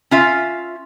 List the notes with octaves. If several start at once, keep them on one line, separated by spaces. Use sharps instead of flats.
C#4 F4 E5